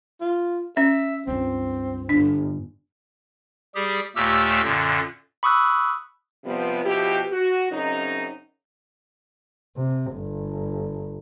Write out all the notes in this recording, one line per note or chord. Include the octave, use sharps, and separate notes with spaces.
F4
C#4 E5
C#2 G2 C4
G1 D4
G3 G4 G#4
D#2 A#2 A3 G4 E6 F6
F#2 A#2 D3
B5 C#6 D#6 E6 F#6
C3 F3 G3 B3
B2 F3 E4 G4
F#4
F#2 C#3 F#3 C4 D#4
C3
G1